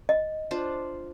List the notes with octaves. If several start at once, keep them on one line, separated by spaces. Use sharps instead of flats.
D#5
D4 F4 C5